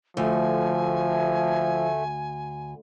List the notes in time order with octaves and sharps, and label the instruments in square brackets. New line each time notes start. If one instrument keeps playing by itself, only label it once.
[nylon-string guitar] D2 [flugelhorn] F3 [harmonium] A3 [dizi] G#5